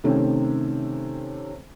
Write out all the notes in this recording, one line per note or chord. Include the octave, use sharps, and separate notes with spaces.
C3 D#3 A3 C4 C#4